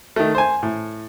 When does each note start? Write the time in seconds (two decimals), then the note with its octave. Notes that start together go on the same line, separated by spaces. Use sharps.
0.16 D#3 A3
0.35 C5 G#5
0.63 A2